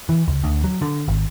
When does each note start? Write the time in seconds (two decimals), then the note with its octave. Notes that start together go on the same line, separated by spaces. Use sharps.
0.09 E3
0.28 C#2
0.44 D2
0.64 F#3
0.82 D3
1.08 G#1